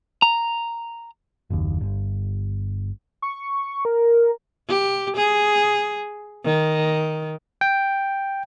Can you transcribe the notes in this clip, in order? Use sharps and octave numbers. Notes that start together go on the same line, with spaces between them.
A#5
F#1 D#2
G1
C#6
A#4
G4
G#4
D#3
G5